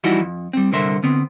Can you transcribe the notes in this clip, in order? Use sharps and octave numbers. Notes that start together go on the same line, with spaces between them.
E3 F3 G3 D#4 E4 F#4
F2
G3 C4
C2 G2 D3 A#4 C5 E5
D3 B3 C4